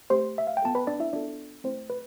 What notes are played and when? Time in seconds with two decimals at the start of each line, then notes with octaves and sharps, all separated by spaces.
0.10 A3 C4 G4 C5 C6
0.38 E5
0.47 F5
0.57 G5
0.62 B3 F4 A4 A5
0.75 B4 B5
0.87 D4 D5
1.00 E4 E5
1.13 B3 D4 F4 A4 D5
1.64 A3 C4 E4 C5
1.90 B4